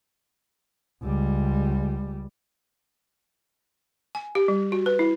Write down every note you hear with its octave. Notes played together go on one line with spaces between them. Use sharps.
C#2 G3
G#5
G4
G3
F#4
B4
E4